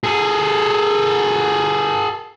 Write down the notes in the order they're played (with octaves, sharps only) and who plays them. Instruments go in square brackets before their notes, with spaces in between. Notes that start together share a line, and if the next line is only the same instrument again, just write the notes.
[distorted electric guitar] G#4 A4